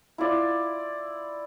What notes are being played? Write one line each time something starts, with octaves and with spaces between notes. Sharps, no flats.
E4 F4 D5